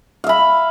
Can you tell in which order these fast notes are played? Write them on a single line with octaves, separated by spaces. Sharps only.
F5 E5 B5